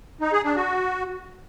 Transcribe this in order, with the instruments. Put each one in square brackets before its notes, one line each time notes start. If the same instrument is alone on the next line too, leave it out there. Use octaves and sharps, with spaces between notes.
[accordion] D#4
G#4
D4
F#4